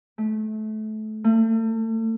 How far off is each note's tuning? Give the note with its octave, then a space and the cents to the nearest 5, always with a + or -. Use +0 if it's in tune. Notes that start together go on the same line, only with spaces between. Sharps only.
A3 -25
A3 +35